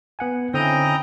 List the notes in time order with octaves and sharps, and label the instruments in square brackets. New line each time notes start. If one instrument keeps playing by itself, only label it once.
[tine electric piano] B3 F#5 G#5
[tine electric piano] D3 C4 [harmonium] C#4 E4 [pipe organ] D#5 G5 A#5